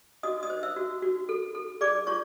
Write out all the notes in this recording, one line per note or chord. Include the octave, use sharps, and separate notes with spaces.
F#4 D#5 D#6
D#5 D#6
C5
E5 E6
F#4
F#4
A4
A4
G#4 D5 D6
F4 C#5 C#6